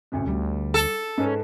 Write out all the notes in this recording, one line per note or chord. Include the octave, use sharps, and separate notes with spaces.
A1 D2 C3
D2 G3
A4
G#2 C#4 B4